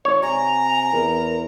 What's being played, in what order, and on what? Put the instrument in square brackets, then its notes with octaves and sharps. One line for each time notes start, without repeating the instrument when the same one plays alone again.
[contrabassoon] G#1 [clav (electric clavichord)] C#5 [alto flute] D5
[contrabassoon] C3 [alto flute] G#5 [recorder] A#5
[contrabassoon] E2 [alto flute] A#4